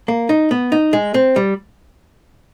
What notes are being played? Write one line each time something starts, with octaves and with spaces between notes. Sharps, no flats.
A#3
D#4
B3
D#4
G#3
C4
G3